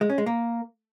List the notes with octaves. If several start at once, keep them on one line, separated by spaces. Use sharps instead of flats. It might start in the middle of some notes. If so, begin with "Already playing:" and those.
G#3
C#4
G#3
A#3